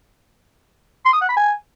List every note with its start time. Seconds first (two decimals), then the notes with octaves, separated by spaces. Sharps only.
1.05 C6
1.13 D#6
1.21 F#5
1.29 B5
1.37 G#5